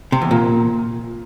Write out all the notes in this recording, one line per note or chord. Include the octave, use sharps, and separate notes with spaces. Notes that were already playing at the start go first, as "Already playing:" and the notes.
C3
E2
A#2